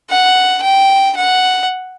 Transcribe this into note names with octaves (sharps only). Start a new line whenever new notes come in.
F#5
G5
F#5